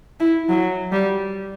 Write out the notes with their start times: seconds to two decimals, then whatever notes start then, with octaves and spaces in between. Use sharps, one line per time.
0.20 E4
0.49 F#3
0.92 G3